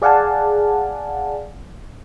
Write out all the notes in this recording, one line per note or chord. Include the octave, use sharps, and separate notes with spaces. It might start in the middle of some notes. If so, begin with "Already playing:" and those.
G#4 D5 F5 F#5 G#5 A5